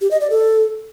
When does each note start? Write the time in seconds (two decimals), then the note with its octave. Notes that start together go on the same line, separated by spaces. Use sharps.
0.01 G4
0.11 D#5
0.21 D5
0.30 A4